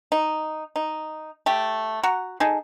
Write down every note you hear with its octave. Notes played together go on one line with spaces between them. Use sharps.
D#4
D#4
A3 G4
F#4 F#5 A#5
D#4 G#4 A4